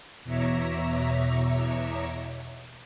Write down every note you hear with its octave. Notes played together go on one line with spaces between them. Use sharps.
E2 B2 C#5 E5 A#5 D6